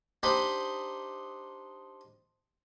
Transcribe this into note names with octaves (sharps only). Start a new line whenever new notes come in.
D4 D#4 G4 C5 B5